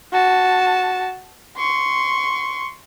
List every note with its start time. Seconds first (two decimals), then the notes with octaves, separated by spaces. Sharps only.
0.12 F#4 A5
1.57 C6 C#6